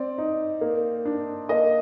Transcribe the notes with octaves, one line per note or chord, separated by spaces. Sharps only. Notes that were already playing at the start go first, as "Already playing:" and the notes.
Already playing: C4 D5
D#4
A#3
D4
A#3 D#5